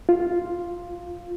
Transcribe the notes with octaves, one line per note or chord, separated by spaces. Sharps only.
F4